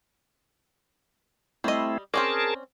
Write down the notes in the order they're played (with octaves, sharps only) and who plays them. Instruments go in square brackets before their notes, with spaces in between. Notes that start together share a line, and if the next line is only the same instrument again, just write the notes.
[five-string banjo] G3 D#5 [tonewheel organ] A3 C4 E4
[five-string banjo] C4 C#4 D5 [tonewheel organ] G#4 A#4 A5